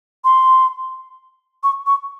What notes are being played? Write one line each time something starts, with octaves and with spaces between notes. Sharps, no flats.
C6
C#6
C#6